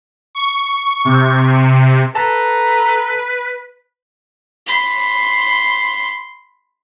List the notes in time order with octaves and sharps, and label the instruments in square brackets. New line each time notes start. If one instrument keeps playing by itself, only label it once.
[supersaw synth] C#6
C3
[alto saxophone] A4 [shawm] B4 [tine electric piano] A5 [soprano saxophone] A#5
[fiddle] B5 C6